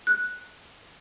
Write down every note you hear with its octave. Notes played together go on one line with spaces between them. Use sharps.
F#6